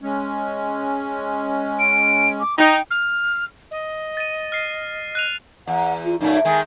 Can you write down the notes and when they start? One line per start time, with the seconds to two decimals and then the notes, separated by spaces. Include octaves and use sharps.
0.02 G#3 C#4
1.80 D7
2.40 D6
2.58 D#4 G5
2.91 F6
3.71 D#5
4.17 A6 D#7
4.52 F6 C7
5.15 F#6 D#7 F7
5.67 E2 F#5
6.05 F4
6.21 F#2 A#2 A3 D#4
6.45 D#3 G#3 G#5